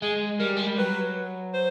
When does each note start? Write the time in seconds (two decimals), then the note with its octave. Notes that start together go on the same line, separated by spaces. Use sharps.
0.02 G#3 G#4
0.40 G3 A#4
0.57 G#3
0.67 G3
0.78 F#3 B4
1.53 C5